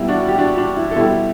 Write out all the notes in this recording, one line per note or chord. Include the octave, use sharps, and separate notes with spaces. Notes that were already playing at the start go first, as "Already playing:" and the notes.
Already playing: B2 G3 E4
D4 F#4
G4
D4 F#4
D4 F#4
E4
A4
B2 G3 E4 G4